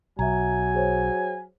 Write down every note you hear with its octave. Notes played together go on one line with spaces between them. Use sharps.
B1 F#3 E5 G#5 A#5
G#4 C5 C#5